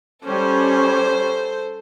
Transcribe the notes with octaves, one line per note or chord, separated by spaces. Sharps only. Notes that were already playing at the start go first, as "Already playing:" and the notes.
G3 C#4 A4 C5